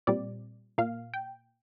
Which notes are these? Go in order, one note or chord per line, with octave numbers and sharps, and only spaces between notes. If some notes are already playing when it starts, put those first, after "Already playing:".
A#2 G3 C4 D5
A#2 A#3 F5
G5